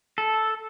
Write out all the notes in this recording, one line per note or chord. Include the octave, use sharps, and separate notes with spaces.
A4